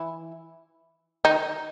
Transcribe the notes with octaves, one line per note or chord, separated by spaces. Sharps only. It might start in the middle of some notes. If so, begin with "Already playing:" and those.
Already playing: E3 E4
D#3 D#4